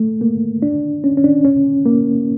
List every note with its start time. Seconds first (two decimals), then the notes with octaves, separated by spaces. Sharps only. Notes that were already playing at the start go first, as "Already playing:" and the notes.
Already playing: A3
0.21 A#3
0.62 D4
1.04 C#4
1.17 C#4
1.24 D4
1.45 C#4
1.86 A#3